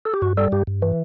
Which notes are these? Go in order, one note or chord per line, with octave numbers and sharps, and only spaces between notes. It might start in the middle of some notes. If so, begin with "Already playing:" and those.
A4
G4
G2 F#4
G3 A4
G2 G4
G2
E3